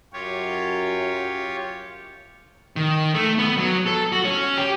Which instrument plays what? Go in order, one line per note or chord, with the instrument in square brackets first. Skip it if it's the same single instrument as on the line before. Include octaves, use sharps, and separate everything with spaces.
[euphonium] F#2 [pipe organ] F4 G4 C#5
[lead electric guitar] D#3
A3
B3
F#3
A4
F#4
C#4
G4